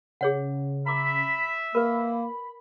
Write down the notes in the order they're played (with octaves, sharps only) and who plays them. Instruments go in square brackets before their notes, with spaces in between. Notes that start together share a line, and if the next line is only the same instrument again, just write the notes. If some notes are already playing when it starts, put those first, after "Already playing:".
[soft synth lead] C#3 [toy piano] G#4 C#5 F#5
[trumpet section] E5 [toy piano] A#5 D6 [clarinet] B5
[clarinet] A#3 [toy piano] A#4 B4 [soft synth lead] B5